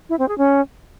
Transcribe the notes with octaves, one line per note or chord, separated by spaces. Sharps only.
E4
C4
G#4
C#4